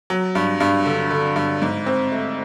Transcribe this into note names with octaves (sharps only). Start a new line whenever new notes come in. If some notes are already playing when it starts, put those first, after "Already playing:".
F#3
G2
G2
D3
D3
G2
G#2
C4
A3